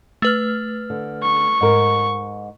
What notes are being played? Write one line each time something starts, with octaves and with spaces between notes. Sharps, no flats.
A3 B4 F6
D3
C#6
G#2 A#4